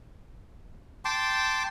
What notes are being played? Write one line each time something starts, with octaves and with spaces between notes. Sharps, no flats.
G5 A5 C6 D6